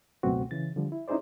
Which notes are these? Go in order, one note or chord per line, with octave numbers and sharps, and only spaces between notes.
C#2 F#2 B2 A3 C4 F#4
C#3 E3 A6
D3 F3 G3
E4
C#4 D#4 E4 G#4 C5 D5